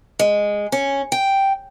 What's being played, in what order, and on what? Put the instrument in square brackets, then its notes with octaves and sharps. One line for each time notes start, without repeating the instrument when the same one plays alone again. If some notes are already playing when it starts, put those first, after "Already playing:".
[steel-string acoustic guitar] G#3
C#4
G5